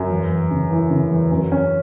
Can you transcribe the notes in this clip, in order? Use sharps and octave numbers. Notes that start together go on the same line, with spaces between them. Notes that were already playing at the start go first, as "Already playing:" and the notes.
Already playing: F#2
E2
E2
C#3
E3
C#3
E2
F#2
C#4